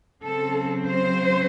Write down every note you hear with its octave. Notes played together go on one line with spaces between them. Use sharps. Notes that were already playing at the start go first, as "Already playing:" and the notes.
C#3 F#3 C4 A4
C5